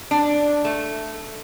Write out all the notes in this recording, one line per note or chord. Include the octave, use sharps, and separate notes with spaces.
D4
A3